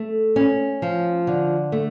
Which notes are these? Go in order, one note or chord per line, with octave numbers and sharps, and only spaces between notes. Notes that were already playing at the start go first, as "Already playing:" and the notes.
Already playing: A3
C#4
F3
D3
A3